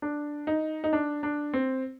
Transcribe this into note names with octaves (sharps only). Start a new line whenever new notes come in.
D4
D#4
D#4
D4
D4
C4